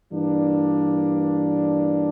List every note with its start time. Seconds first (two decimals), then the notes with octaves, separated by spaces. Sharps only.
0.11 G2 E3 A#3 D4